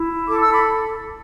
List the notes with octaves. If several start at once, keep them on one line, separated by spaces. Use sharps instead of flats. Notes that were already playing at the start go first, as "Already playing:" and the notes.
Already playing: E4
A4 D6
E6
B5 D6